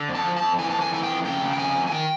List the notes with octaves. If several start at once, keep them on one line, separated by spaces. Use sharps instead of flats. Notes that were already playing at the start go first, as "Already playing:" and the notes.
Already playing: D3
F2
A5
F3
A5
F2
E3 G#5
A5
F2
G#5
E3 G#5
G5
F2
C#3 G5
C#3
G5
F2 G#5
F2
G#5
D#3 G5